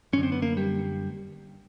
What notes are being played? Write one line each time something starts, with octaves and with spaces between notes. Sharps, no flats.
F#2 D3 C#4
C4
B3
A#3
G3